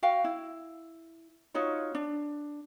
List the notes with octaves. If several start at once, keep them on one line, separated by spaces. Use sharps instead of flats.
F#4 F5 G5
E4
D#4 F4 F#4 C#5
D4